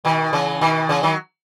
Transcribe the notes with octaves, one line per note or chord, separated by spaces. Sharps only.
B2 D#3
C#3 E3
B2 D#3
C#3 E3
D#3 F#3